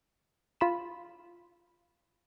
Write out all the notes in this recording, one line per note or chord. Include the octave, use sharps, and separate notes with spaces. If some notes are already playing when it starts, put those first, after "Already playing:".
F4 B5 E7